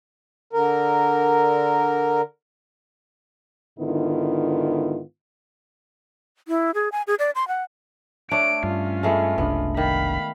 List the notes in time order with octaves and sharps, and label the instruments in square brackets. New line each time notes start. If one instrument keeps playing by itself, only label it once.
[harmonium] D3 A#4
[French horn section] G#2 D3 D#3 B3 E4 F4
[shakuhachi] E4
G#4
G#5
G#4
D5
C6
F#5
[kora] A3 D4 C#5 [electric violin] D7
[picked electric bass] G2 [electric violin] C#4 F4
[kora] G#3 A3 B3
[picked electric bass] F#1 C2 D4 [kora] B3
[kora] D#3 [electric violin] F5 B5